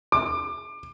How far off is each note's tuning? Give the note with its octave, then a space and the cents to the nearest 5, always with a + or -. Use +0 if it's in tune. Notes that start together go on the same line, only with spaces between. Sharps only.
D6 +25